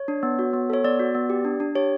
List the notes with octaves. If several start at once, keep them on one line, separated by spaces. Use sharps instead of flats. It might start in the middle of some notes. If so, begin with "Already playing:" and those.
Already playing: C#5
D4
B3
F#4
B3
A4 C#5
B3 D5
F#4
B3
G4
D4
D4
G4 C#5